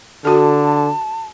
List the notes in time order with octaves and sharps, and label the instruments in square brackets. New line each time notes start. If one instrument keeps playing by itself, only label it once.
[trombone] D3 [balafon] F#4 A4 [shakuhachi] A5